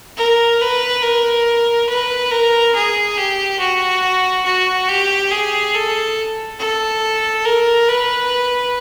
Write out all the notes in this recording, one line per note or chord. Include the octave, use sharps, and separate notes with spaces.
A#4
B4
A#4
B4
A#4
G#4
G4
F#4
F#4
G4
G#4
A4
A4
A#4
B4